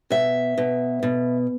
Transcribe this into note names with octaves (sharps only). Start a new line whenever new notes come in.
B2 E5
B2
B2